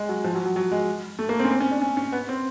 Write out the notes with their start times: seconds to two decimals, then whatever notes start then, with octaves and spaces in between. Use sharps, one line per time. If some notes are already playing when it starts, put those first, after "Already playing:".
Already playing: G#3
0.09 F#3
0.24 F3
0.35 F#3
0.45 F#3
0.56 F#3
0.71 G#3
1.19 A3
1.29 A#3
1.40 C4
1.45 C#4
1.51 C4
1.60 C#4
1.71 D4
1.82 C#4
1.97 C#4
2.12 B3
2.29 C4